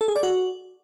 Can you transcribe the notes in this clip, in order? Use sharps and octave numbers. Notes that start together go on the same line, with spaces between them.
A4
G#4
D5
F#4